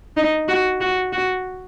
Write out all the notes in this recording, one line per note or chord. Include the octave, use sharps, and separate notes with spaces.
D#4
F#4
F#4
F#4